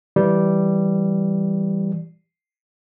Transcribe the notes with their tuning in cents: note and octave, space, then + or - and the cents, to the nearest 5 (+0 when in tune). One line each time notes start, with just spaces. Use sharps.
E3 +0 G3 -5